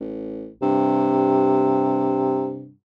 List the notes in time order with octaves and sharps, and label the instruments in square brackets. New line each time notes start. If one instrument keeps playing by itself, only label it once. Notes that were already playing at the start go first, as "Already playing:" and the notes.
[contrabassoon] A1
[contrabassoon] G2 [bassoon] C3